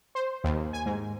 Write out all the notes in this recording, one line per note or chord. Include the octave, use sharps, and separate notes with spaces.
C5
D#2
G#5
G#2